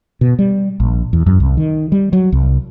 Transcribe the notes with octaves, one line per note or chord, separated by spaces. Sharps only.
B2
G3
A#1
E2
F#2
C2
D#3
G3
F#3
C2